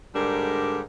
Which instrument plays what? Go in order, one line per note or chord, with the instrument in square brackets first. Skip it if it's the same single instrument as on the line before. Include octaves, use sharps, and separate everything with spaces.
[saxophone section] G#2 D3 G3 D4 A#4